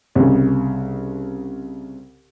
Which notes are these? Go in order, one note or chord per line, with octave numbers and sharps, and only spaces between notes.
C2 C#3